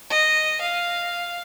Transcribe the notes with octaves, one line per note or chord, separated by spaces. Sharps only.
D#5
F5